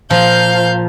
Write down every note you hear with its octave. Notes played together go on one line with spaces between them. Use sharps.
A#2 F3 F5 G6